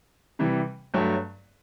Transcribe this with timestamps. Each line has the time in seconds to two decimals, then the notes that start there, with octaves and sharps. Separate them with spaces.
0.39 C3 E3 G3
0.94 G2 F#3 A3